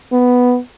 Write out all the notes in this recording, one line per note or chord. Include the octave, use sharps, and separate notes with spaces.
B3